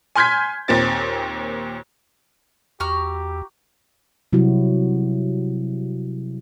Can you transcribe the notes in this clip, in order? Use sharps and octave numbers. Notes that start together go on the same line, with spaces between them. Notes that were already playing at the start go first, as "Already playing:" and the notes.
G#5 C6 F6 G6 G#6 B6
D#2 A#2 C4 A6
E2 F#4 G4 A#5 F6
C3 F#3 G3 E4 F#4